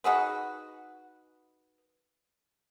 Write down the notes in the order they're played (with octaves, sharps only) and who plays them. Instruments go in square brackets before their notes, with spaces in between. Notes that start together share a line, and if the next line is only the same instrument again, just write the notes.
[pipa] D#4 F#4 G#4 B4